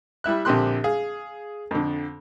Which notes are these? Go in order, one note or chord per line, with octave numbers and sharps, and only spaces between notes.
G3 E4 E5 F#6
A#1 D3 C4 G4 C6 F#6
G#4 F5
F2 D3